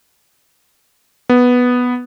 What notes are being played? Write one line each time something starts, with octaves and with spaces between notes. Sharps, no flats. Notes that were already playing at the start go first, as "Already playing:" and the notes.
B3